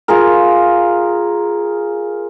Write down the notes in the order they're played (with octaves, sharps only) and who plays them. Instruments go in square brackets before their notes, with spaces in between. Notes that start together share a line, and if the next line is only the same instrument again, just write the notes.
[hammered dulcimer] F4 G#4 A#4